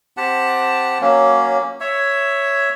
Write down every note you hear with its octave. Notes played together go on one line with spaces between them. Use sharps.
C4 G4 F#5 A5
F#3 A#3 C#4
C#5 E5